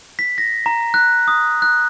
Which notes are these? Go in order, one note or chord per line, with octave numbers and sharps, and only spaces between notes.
B6
A#6
A#5
F#6
D#6
F#6